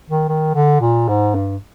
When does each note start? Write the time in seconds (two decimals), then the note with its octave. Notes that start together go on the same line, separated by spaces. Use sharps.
0.10 D#3
0.28 D#3
0.55 D3
0.81 A#2
1.08 G#2
1.35 G2